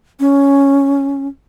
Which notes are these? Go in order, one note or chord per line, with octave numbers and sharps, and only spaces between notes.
C#4